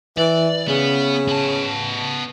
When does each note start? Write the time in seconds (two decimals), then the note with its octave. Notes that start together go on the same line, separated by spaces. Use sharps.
0.18 E3 D5
0.68 C#3 B3
1.28 B3 A5